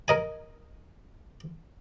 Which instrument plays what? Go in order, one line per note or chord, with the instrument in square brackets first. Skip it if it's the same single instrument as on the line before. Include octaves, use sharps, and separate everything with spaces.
[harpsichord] A#4 D#5 G#5